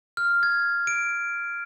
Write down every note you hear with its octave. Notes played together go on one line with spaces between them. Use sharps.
F6
G#6
D7